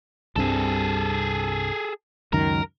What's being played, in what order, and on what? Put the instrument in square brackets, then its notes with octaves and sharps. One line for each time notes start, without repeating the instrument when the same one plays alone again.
[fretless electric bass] C2 G2 C3 [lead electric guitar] G#4 A4
[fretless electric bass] C#2 F#2 D#3 [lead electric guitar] A#4